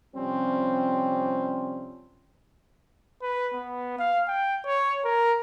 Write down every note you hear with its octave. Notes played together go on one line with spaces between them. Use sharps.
C3 F3 G3 C4 C#4
B4
B3
F5
G5
C#5
A#4